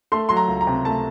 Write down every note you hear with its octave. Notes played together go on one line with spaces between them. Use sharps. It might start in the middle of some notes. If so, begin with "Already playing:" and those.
A3 C6
F#3 C6
A#5
C#2
A#5
C3
A3 A5